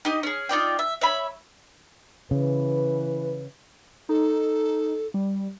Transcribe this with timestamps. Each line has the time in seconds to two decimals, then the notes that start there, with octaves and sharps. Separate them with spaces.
0.05 D#4 G4 D#5
0.23 C#4 G#4
0.49 D#4 F4 D5 G5
0.79 E5
1.01 C#5 E5 B5
2.31 C#3 E3 B4
4.09 D#4 A4
5.14 G3